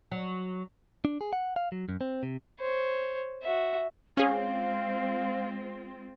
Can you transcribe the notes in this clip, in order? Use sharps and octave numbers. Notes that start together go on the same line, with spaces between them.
F#3
D4
G#4
F#5
F5
F#3
F#2
C4
C3
C5 C#5
F#4 E5
G#3 C4 C#4 F4 G#4 F5